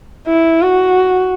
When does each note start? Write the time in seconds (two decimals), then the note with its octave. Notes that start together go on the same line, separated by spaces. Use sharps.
0.27 E4
0.62 F#4